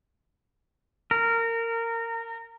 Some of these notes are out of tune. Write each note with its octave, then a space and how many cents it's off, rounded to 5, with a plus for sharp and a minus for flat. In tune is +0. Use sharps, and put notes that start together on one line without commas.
A#4 -20